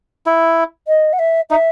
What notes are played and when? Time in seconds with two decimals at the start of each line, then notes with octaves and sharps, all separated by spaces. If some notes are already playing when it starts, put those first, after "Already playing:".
0.26 E4
0.88 D#5
1.13 F#5
1.19 E5
1.50 D#4 E5